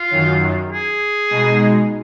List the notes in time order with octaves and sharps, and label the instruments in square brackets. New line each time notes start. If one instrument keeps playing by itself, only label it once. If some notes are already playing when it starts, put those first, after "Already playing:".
Already playing: [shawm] F4
[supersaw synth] F#2 D#3 F#3
[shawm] G#4
[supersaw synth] B2 G#3 D#4